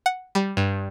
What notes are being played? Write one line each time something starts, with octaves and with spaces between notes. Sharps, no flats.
F#5
G3
G2